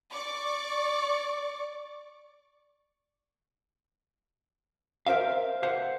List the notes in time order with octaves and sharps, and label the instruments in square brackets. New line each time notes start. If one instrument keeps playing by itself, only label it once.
[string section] D5 C#6 D6
[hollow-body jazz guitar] A#4 C5 E5 F5
C5 F5 F#5